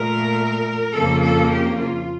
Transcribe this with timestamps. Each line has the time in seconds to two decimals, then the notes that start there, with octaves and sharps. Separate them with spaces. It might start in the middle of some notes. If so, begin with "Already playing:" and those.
Already playing: A#2 A3 A#4
0.95 F2 C#3 F3 A#3 A4
1.23 A4
1.52 G4
1.79 F4